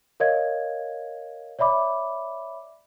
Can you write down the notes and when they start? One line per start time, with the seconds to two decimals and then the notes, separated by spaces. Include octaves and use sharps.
0.20 A#4 C#5 D#5 F5 G#6
1.59 C#5 D5 E5 B5 D6